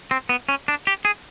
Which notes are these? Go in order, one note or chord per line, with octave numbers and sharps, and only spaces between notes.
C4
B3
C#4
D4
G4
G#4